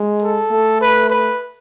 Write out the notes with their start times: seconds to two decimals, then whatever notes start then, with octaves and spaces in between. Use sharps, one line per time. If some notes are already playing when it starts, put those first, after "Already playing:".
Already playing: G#3
0.22 A4
0.51 A3
0.81 B4
1.10 B4